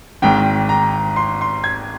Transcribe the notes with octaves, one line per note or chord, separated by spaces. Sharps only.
G#1 G#2 D#3 G5
A#5
C6
C6
G#6